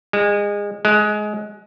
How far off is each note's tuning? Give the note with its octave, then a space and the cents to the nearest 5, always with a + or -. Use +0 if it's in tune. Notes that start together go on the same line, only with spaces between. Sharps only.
G#3 -25
G#3 +20